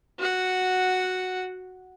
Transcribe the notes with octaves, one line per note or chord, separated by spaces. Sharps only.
F#4 F#5